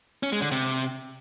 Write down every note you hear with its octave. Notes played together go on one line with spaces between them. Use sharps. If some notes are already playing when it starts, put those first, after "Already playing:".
C#4
G#3
D3
C3